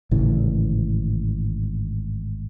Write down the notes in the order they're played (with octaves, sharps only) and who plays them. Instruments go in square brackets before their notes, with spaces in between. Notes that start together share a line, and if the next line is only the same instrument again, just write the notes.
[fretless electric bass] G#1 A2 C#3 E3